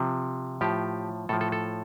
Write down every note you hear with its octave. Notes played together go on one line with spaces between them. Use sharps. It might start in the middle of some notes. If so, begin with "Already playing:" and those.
Already playing: C3 F3
A2 F3 G4
A2 F3 A4
A4
A4